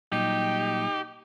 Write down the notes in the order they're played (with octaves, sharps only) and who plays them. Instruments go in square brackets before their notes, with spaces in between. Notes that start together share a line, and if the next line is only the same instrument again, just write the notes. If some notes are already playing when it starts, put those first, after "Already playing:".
[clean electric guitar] A#2 F#3 G3 [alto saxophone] D#4 [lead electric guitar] G4